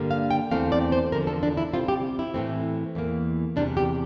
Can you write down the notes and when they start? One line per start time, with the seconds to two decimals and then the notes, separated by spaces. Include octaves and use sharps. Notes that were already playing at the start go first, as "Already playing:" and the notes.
Already playing: G2 D3 G3 A#3
0.11 F5
0.31 G5
0.51 E2 E3 A3 C4 F5
0.72 D5
0.92 C5
1.12 E2 D3 F3 A#4
1.27 A4
1.43 D4
1.57 E4
1.73 C3 G3 C4 F4
1.88 G4
2.19 E4
2.34 A2 E3 A3 C4
2.95 E2 E3 A#3
3.56 E2 C3 G3 D4
3.77 G4